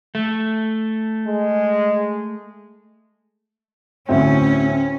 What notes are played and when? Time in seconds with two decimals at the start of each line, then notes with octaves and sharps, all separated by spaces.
0.15 A3
1.27 G#3
4.09 D2 A2 C4 C#4